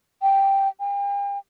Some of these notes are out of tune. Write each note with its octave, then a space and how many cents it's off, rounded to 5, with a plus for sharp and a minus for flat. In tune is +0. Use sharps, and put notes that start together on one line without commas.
G5 +0
G5 +40